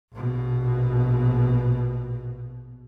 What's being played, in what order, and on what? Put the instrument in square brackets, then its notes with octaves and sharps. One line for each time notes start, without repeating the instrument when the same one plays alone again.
[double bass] A#1 B2